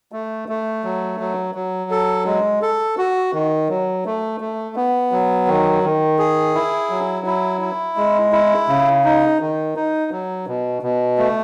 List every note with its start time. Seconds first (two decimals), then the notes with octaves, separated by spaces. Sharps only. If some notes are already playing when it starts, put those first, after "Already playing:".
0.12 A3
0.49 A3
0.84 F#3
1.20 F#3
1.55 F#3
1.91 A4
2.26 G#3
2.62 A4
2.98 F#4
3.33 D#3
3.69 F#3
4.05 A3
4.40 A3
4.76 B3
5.12 F#3
5.48 D#3
5.83 D#3
6.19 G#4
6.55 E4
6.90 F#3
7.26 E4
7.61 E4
7.97 G#3
8.32 E4
8.68 C#3
9.04 D#4
9.40 D#3
9.76 D#4
10.12 F#3
10.47 B2
10.82 B2
11.18 A3